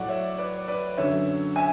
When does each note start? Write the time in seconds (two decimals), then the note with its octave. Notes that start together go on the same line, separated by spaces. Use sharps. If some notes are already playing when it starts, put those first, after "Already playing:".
Already playing: A2 F#3 D5 F#5
0.09 C#5 E5
0.38 B4 D5
0.68 B4 D5
0.97 F#2 D3 F#3 C#5 E5
1.56 E5 G#5